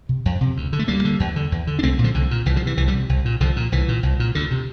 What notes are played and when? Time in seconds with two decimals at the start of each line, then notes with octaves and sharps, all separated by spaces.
0.09 C3
0.25 F2
0.41 C3
0.57 D2
0.73 D3
0.79 A3
0.88 D2 G3 A#3
1.05 D3
1.20 E2
1.36 D3
1.52 E2
1.67 D3
1.79 D4
1.83 C2 A3 C4
1.99 A#2
2.04 D3 F3
2.14 C2 D3
2.31 A#2
2.46 C2 E3
2.56 D3 F3
2.62 C3 E3
2.77 C2 E3
2.88 E3 G3
2.94 C3
3.09 C2
3.25 A#2
3.40 C2 D3 F3
3.56 A#2
3.72 C2 E3
3.88 A#2
4.03 C2
4.20 A#2
4.35 D2 D3
4.51 C3